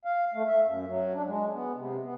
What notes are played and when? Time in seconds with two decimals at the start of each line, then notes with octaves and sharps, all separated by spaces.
0.05 F5
0.34 A3
0.47 E5
0.67 F#2
0.88 F#3
1.14 D4
1.26 G#3
1.53 B3
1.75 C3
2.02 B3